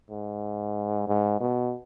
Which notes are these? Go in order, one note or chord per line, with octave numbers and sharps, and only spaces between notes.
G#2
G#2
B2